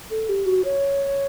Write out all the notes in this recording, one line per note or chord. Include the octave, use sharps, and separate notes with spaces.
A4
G4
F#4
C#5